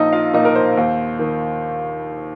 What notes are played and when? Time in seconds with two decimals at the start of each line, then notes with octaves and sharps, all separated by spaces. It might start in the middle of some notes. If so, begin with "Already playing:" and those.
Already playing: A#1 D#4 D#5
0.13 F4 F5
0.34 A#2 D#4 D#5
0.45 A#4
0.55 C5
0.77 D#2
1.19 D#3